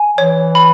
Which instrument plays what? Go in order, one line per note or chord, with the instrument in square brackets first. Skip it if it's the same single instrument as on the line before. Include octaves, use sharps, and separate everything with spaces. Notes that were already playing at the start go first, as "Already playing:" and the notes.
Already playing: [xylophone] G#5
[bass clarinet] E3 [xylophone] C#5
[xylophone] B5